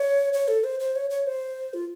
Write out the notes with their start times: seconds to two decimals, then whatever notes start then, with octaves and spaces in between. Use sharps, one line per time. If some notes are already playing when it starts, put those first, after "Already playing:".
Already playing: C#5
0.33 C#5
0.48 A4
0.64 C5
0.80 C5
0.96 C#5
1.10 C#5
1.27 C5
1.74 F4